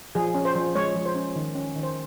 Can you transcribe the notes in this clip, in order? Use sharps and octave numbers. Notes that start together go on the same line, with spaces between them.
F3 G#4
C#4
C5
F3
G#3 C#5
F3
C5
C#4
D#3
C#4
D#3
C5